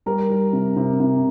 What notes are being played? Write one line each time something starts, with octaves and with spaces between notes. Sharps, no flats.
G3 A#4
G3
C3
C3
C3